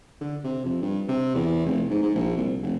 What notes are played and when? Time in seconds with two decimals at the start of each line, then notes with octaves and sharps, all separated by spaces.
0.21 D3
0.44 C3
0.65 F2
0.82 G2
1.08 C3
1.35 E2
1.66 F1
1.90 G#2
2.03 G#2
2.15 A#1
2.37 C2
2.62 F1